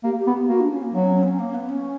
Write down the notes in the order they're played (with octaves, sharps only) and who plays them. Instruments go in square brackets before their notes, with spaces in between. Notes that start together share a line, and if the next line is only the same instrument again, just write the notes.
[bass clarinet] A#3 [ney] G4
[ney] G4
[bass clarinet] B3
[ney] G4
[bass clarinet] A#3 [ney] F#4
[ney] D4
C#4
A#3
[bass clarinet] F#3 [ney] B3
[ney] C#4
C#4
B3
C#4
A#3
B3
C#4